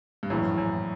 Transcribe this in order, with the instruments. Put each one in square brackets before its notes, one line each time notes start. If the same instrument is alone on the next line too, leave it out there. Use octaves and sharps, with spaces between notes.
[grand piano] G2
[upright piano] A#1 A2 E3 [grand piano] F#2
[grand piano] F#2